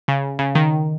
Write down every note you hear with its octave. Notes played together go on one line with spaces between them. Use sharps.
C#3
C#3
D#3